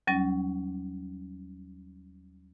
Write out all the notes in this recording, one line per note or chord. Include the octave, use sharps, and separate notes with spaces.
D#2 F#3 G3 C#4